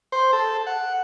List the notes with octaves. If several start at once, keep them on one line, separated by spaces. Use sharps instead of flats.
C5
A4
F#5